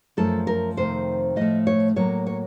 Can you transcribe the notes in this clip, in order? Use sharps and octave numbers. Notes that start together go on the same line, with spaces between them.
F#2 F3 A3 A4
A#4
F2 C3 D#3 C5
A2 F3 A3 D#5
C#5
A2 F#3 A#3 C#5
C#5